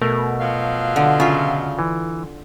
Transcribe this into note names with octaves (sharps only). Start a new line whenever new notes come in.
B2 A3 A#4
F3 F#3 F5
D3
C#3 F4 E5
E3